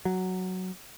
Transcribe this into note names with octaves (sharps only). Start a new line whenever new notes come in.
F#3